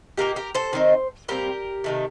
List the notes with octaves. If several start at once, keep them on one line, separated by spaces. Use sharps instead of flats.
A#2 G3 A#3 D#4 G4 A#4
G4 A#4
A4 C5
D#3 A3 C4 D#4
A#2 G3 C4 G4 A#4
C3 D#3 A3